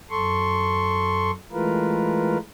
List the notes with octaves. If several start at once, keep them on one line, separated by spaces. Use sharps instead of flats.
F#2 A4 C6 C#6
E3 G#3 A3 F4 A#4 B4